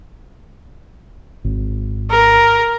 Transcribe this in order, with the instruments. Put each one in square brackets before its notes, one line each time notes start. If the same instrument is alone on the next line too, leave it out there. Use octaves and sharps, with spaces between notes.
[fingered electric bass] G#1
[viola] A#4